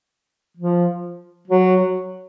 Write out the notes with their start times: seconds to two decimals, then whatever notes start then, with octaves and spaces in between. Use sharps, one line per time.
0.57 F3
1.48 F#3